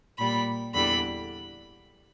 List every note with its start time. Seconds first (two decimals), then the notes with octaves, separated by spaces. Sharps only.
0.18 A#2 G3 B5
0.74 E2 D3 G3 B5